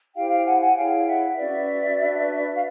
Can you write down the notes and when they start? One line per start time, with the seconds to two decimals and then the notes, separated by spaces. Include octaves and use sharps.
0.15 E4 G4 C5 F5 G5
0.30 F5 G5
0.45 F#5 G#5
0.61 F#5 G#5
0.75 E4 G#4 C#5 F5 G5
0.95 G5
1.07 E5 F#5
1.37 C#4 F#4 B4 D5 E5
1.99 D4 F#4 B4
2.55 F5